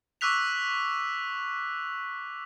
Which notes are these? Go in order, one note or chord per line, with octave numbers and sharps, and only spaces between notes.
C#6 D6 E6 F#6 B6 F7